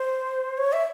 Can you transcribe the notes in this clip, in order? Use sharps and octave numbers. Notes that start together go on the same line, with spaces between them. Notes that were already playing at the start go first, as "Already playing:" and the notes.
Already playing: C5
C#5
E5